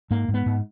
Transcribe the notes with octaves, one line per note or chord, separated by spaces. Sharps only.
G#2 A#3
G#2
B3
G#2